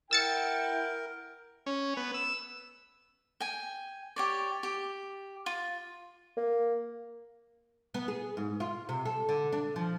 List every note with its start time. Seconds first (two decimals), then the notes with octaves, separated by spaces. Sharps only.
0.11 E4 A#4 F#5 G5 E6 A6 C#7
1.66 C#4
1.97 B3
2.14 E6
3.40 G5 G#5
4.16 G4 C#5 D5
4.63 G4
5.46 F4
6.37 A#3
7.94 B3
8.08 G#4
8.37 G#2
8.60 F4
8.89 C3
9.05 A4
9.29 D3
9.52 D4
9.76 F3